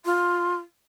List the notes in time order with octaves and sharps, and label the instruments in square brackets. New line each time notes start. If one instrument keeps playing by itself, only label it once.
[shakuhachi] F4 [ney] C6